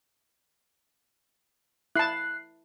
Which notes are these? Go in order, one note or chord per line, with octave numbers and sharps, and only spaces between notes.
E4 A5 F#6 C7